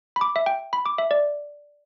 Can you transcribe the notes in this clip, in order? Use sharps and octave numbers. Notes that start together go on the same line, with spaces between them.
B5
D6
E5
G5
B5
D6
E5
D5